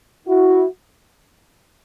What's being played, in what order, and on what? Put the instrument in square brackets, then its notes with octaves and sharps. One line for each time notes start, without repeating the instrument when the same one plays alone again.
[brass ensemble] E4 F#4